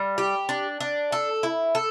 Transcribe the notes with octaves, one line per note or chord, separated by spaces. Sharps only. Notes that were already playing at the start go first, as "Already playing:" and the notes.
Already playing: G3
G4
D4
D4
A4
E4
A4